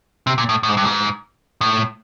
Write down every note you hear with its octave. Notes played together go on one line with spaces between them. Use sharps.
C3
A#2
A2
A2
G#2
G2
G#2
A2